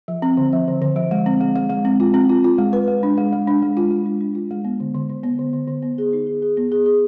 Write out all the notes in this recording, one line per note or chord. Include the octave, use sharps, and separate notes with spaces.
F3
C4
D3
F3
D3
D3
F3
G#3
C4
G#3
G#3
G#3
C4
F4
C4
F4
F4
G#3
B4
G#3
D4
G#3
G#3
D4
G#3
F4
G#3
D4
D4
F4
G#3
B3
D3
D3
D3
B3
D3
D3
D3
B3
G#4
D#4
G#4
G#4
B3
G#4
G#4